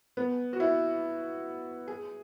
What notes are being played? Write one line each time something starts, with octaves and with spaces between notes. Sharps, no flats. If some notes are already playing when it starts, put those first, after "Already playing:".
B3
F#4
E4
G#4